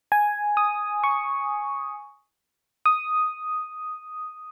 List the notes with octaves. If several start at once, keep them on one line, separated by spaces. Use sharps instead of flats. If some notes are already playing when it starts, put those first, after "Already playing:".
G#5
D#6
C#6
D#6